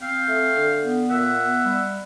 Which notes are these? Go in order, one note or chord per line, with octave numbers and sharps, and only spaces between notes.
C4 F5 G5
A3
D3
B3
A#2 E5 F#5
B3
G3